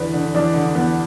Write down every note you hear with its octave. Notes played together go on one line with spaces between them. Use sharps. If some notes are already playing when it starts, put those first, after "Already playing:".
Already playing: E2 D3 B4 D5
D3
E2 D4
D3
E2 B3